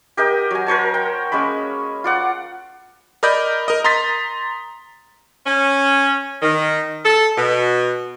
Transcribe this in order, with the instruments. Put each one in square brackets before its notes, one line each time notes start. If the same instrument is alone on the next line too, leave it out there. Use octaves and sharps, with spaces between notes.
[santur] G4 A#4 D#5 G5
F#3 G#5
A#4 C5 C#5 A5
G5
G#3 A#3 C#4 B5
F4 D5 F#5
[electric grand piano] A#4 D5 D#5 B5 G6
A#4 D#5
A#5 C6 D#6 A6 B6
[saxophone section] C#4
D#3
A4
B2